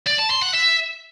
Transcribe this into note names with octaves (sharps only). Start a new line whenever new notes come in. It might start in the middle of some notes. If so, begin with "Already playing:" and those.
D5
A5
C6
F#5
E5